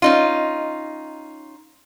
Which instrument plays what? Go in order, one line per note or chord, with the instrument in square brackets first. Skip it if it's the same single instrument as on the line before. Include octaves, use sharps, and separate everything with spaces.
[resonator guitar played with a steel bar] C#4 D#4 F4